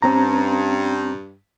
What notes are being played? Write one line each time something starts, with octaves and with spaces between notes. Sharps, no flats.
G2 C4 C#4 A#5